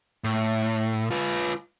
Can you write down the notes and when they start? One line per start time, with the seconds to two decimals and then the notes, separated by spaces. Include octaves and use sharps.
0.24 A2
1.11 F4 B4